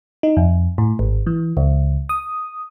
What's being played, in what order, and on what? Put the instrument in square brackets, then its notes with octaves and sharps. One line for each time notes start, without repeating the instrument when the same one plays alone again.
[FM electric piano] D#4
F2
A2
G#1
E3
C#2
D#6